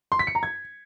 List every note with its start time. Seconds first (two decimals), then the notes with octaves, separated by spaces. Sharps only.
0.12 C6
0.19 B6
0.27 C#7
0.35 A#5
0.43 G#6